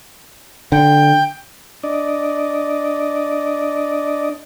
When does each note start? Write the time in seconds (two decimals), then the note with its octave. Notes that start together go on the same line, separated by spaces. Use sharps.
0.72 D3 G5
1.83 D4 D5 D#5